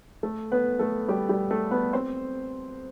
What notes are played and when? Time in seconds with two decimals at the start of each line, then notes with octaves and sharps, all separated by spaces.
0.23 A3 A4
0.52 B3 B4
0.79 A3 A4
1.08 G3 G4
1.29 G3 G4
1.51 A3 A4
1.71 B3 B4
1.93 C4 C5